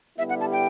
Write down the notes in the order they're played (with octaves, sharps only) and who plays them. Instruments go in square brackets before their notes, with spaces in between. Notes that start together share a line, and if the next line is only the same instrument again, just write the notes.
[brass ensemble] D3 G3 B3 E4 G4 [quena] E5
[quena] F#5
A5
G5